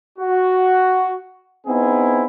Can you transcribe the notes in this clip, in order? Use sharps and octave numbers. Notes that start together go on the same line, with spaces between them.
F#4
B3 C4 D#4 E4 G#4